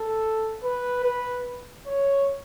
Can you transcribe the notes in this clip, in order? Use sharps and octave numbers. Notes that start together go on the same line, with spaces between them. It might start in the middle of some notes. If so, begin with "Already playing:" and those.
Already playing: A4
B4
B4
C#5